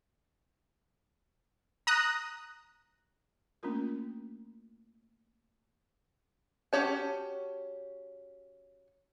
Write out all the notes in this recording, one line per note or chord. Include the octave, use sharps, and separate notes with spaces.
A#5 D#6 F#6
A3 A#3 C#4 D4 F4 A#4
C#4 F#4 G4 C#5 A5